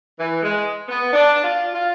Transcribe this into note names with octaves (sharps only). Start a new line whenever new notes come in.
E3
G#3
B3
D4
F4
F4